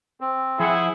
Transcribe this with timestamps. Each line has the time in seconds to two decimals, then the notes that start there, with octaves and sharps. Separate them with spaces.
0.21 C4
0.60 F3 E4 G#4 C5 F#5